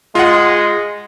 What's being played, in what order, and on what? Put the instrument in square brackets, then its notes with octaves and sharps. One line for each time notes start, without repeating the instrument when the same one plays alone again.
[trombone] G#3 [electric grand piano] F4 F#5